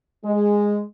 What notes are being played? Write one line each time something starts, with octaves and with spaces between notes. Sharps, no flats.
G#3